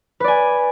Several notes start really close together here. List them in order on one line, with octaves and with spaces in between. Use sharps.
B4 D5 G#5